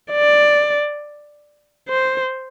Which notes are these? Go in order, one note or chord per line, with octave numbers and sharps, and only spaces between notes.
D5
C5